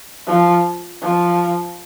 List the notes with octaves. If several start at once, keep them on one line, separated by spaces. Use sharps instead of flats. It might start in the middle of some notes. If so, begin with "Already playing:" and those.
F3
F3